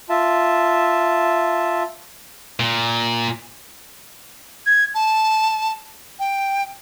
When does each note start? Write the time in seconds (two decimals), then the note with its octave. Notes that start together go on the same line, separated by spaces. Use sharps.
0.09 F4 E5 A5
2.60 A#2
4.66 G#6
4.95 A5
6.19 G5